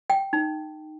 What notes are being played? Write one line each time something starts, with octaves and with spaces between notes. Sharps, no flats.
G5
D#4